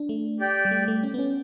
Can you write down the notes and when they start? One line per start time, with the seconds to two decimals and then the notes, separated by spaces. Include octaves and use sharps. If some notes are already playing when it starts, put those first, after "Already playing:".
Already playing: D4
0.09 A3
0.40 G4 D5 G5
0.65 G3
0.71 A3
0.88 A3
1.03 C#4
1.14 B3
1.18 C#4